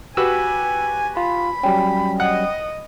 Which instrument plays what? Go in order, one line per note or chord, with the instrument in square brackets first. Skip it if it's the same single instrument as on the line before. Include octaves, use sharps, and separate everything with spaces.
[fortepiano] F#4 G4 B4 [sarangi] G#5 [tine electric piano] E6
[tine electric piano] F4 [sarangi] B5
[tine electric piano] F#3 G3 C#4 [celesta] G5
[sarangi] D#5 [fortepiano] F#5